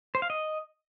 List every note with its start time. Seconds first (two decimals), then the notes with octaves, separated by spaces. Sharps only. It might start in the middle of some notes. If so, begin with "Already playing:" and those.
0.15 C5
0.22 F5
0.30 D#5